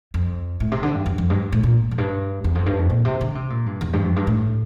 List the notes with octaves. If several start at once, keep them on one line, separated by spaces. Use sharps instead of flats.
F2
A2
C3
D3
G2
F2
F2
G2
A2
A#2
F2
G2
E2
F2
G2
F2
A#2
C3
D3
C3
A#2
G2
E2
G2
F2
G2
A2